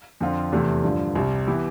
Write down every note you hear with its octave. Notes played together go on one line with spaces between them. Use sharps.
F2 D3 F3 C4 F4
E2 C3 E3 A3 E4
G2 D3 F3
C2 C3 G3
E3 B3 E4 G4